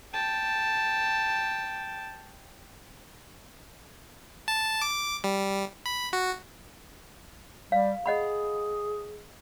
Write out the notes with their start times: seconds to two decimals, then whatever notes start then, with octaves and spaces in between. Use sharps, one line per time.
0.13 G5 A5
4.48 A5
4.82 D6
5.24 G3
5.86 B5
6.13 F#4
7.72 G3 F5
8.06 G#4 D#5 F#5 B5